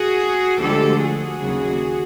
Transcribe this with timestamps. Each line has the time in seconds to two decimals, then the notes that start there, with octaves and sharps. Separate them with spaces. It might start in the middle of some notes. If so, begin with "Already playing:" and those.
Already playing: F#4 G#4
0.60 D2 D3 F3 G#3 G4 A4
1.00 F#4 G#4
1.41 D#2 C#3 F#3